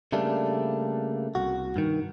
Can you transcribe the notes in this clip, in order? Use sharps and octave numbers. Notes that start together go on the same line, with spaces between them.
C#3 G3 A3 A#3 D4
C2 F#4
G2 D#3